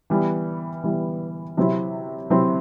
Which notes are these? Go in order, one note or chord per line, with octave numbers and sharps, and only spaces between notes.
E3 G3 B3 E4
E3 G3 B3 E4
C3 F#3 C4 E4
C3 F#3 C4 E4